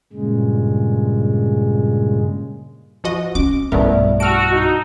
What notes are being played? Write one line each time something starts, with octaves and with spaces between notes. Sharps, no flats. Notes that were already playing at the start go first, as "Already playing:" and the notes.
G2 A#2 C#3 G#3
F3 F#4 D#5
C#4 D6
B1 G2 A3 B3 E4 A#4 D5 E5
F#4 A5 E6 F6 D7 F7
D#4